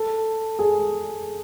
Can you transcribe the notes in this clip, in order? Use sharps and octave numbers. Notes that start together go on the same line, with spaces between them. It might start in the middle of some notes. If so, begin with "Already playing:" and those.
Already playing: A4
G#4